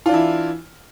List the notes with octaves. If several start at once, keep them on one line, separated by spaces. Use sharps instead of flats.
E3 D4 E4 F4